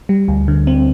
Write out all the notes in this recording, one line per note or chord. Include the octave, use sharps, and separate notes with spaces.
G3
D2
D3
C4